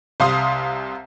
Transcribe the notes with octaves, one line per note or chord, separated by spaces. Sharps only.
C2 C3 F5 C6 D#6